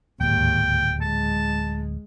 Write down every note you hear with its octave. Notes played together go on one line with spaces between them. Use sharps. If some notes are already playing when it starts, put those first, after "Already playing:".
D1 D#2 G#2 G5
G#3 A5